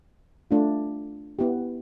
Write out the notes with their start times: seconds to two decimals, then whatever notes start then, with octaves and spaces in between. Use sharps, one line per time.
0.51 A3 D4 F4
1.39 B3 E4 G4